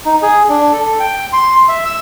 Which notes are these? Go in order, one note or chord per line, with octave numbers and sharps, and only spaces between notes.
D#4
G#4
D4
A4
G5
C6
E5
E6